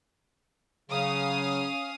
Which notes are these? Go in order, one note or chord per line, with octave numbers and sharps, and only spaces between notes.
C#3 F#3 C#4 F5 D#6